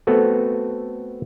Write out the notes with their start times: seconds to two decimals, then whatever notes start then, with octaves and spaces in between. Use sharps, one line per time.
0.07 A3 B3 C4 F#4 A4